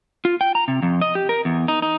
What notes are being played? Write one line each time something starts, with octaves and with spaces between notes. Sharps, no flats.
F4
G5
A#5
C3
F2
D#5
G4
A#4
E2
D#4
D#4